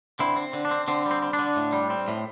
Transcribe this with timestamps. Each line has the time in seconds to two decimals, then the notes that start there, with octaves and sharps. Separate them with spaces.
0.19 D3 C4 E4
0.37 C4
0.53 D3
0.65 D4
0.71 C4
0.88 D3 C4
1.06 G3
1.11 C4
1.22 C4
1.33 D4
1.39 D3
1.56 A2
1.73 G3
1.90 C4
2.08 A2